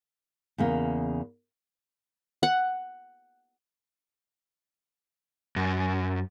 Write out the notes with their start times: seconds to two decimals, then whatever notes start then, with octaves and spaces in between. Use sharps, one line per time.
0.58 E2 C#3 A#3
2.43 F#5
5.56 F#2